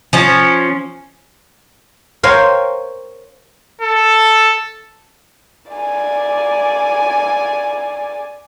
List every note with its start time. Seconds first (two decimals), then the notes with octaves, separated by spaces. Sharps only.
0.13 F3 C#4
2.23 A#4 C5 C#5 F5 G5 G#5
3.82 A4
5.72 D5 G#5